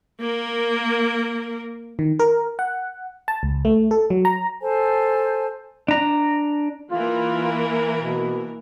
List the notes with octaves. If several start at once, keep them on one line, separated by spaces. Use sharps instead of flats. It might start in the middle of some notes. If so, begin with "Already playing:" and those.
A#3 A#4
D#3
A#4
F#5
A5
C#2
A3
A4
F#3
A#5
A4 C5 G#5 A5
D4 A#5
E3 A#3 F4 A#4
B2